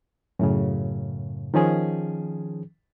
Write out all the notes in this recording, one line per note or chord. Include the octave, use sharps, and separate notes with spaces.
F#2 A2 C#3
D#3 F3 C#4 G#4